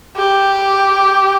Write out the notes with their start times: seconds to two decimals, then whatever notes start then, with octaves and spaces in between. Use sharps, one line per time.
0.17 G4